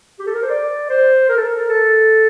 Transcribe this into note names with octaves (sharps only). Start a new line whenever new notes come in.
G4
A4
A#4
C5
D5
C5
A#4
A4
A#4
A4